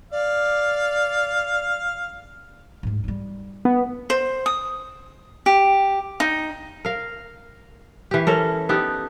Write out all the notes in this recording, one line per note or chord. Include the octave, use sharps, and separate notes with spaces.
D5 F5
D1 G#2
G3 D#4
B3
C5
D#6
G4
D#4
A#4 F5
E3 G4
C#4 A4 A#4
B3 D#4 G4 A4